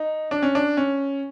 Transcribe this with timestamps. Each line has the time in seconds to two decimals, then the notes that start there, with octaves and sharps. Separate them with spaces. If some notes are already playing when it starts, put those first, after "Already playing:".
Already playing: D#4
0.31 D4
0.43 C#4
0.55 D4
0.77 C#4